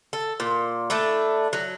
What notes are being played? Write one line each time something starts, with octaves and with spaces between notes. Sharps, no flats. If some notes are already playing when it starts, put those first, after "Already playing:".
A4
A#2
A3 D4 E4
F#3